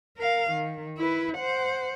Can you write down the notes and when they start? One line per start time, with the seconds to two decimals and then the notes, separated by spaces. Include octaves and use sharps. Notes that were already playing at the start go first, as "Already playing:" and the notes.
0.17 A#4 F5
0.51 D#3
0.98 E4 B4
1.38 C5 F#5